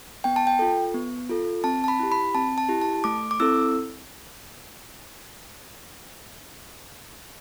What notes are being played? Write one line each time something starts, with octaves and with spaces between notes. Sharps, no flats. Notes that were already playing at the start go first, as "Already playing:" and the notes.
B3 G5
A5
G5
F4 A4
B3
F4 A4
C4 A5
A5
B5
E4 G4
B5
C4 A5
A5
E4 G4
A5
A3 D6
D6
C4 E4 A4 E6